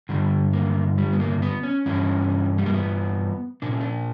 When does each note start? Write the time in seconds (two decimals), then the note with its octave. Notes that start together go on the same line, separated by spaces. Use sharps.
0.09 G2 D3 G3
0.53 A#3
0.98 G3
1.13 B3
1.20 A#3
1.42 B3
1.63 C#4
1.86 G2 E3 C#4
2.58 G3
2.66 A#3
2.74 B3
3.62 A#2 D4
3.71 C#4
3.81 D4